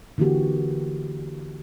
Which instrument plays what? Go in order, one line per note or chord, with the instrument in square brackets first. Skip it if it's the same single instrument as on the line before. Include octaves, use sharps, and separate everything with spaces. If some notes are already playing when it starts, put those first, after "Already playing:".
[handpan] D3 E3 A#3 F#4 G4